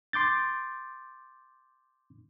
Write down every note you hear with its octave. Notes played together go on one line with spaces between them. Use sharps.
C6 D6 G6 A6